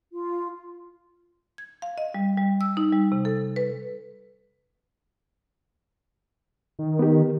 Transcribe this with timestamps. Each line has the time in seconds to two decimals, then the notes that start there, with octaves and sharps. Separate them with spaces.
0.13 F4
1.58 G#6
1.82 F5
1.98 D#5
2.14 G3
2.37 G3
2.61 E6
2.77 D#4
2.93 G3
3.12 C3
3.25 A4
3.56 B4
6.79 D#3
6.99 B3 G4